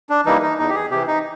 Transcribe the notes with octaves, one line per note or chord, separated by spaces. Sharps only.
D4
E3 G3 A#3 D#4
D#4
E2 D#4
G4
G#4
C3 E3 G4
D#4